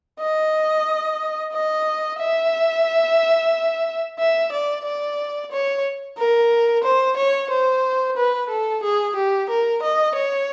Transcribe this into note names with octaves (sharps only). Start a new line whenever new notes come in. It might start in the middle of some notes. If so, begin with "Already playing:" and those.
D#5
D#5
E5
E5
D5
D5
C#5
A#4
C5
C#5
C5
B4
A4
G#4
G4
A#4
D#5
C#5